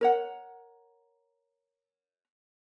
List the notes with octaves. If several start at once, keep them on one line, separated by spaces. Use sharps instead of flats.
A#4 C#5 F#5